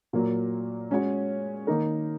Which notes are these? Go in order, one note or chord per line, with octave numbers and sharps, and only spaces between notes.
A#2 F#3 A#3
G#3 C#4 F#4 C#5
D#3 A#3 D#4 A#4